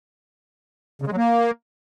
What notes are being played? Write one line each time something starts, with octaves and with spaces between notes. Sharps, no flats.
C#3
G#3
F#3
A#3